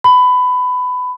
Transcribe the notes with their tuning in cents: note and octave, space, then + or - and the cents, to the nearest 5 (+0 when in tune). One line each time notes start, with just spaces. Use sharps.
B5 +20